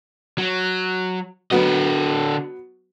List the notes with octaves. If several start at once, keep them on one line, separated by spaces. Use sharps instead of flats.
F#3
D3 F#3 B3 D#5